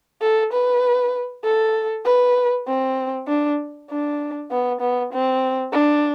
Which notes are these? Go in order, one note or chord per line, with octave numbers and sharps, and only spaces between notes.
A4
B4
A4
B4
C4
D4
D4
B3
B3
C4
D4